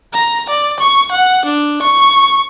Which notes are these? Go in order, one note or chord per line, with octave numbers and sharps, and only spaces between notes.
A#5
D5
C#6
F#5
D4
C#6